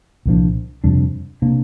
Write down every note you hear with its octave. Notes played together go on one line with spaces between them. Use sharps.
C2 A#2 F3 D4
F2 C3 G3 D4
C3 A#3 D4